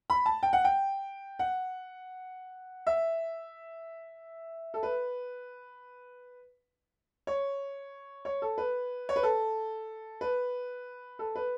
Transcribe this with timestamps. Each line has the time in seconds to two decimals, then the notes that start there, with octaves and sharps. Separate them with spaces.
0.10 B5
0.26 A5
0.43 G5
0.53 F#5
0.65 G5
1.39 F#5
2.87 E5
4.74 A4
4.83 B4
7.27 C#5
8.25 C#5
8.42 A4
8.58 B4
9.09 C#5
9.16 B4
9.23 A4
10.21 B4
11.19 A4
11.36 B4